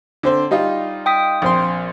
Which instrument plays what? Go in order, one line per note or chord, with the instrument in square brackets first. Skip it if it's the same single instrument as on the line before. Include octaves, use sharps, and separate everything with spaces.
[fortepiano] D3 C4 C5
G3 D#4 F4
[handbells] G5 D#6 B6
[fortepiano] A#1 C4 C6